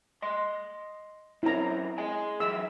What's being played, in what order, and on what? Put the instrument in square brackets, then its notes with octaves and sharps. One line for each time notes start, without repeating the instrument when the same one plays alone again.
[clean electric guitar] D#5 C6
[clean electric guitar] F#2 C4 C#4 [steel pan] E4 A#5
[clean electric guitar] G#4 D#5 G#5
[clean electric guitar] E3 F#3 E5 [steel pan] E6